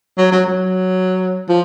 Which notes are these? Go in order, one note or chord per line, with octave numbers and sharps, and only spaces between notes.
F#3
F#3
F#3
F3